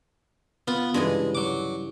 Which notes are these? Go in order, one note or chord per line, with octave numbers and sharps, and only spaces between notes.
B3 F4 B4
G2 C#3 E3 G#3
F#3 D6